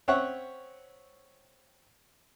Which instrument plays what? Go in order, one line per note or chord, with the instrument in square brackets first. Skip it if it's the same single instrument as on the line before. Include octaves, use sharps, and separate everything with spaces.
[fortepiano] C4 C#4 C#5 E5 F#5